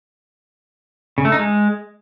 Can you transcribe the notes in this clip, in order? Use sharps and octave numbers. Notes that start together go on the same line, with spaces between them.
C#3
A3
D#4
G#3